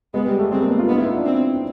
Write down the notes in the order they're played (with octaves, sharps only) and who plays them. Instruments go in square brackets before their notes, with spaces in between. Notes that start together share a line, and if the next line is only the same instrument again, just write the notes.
[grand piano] G#3 [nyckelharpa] B3
[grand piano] G3
A3
[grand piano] G#3 [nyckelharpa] C4
[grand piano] A#3
B3
F4
[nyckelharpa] B3 [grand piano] D#4
[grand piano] E4
F4
D4
[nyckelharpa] C4
[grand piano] C4